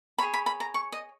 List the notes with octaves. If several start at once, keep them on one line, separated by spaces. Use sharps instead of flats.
G#4 C#5 B5
B5
B5
A#5
C#6
D#5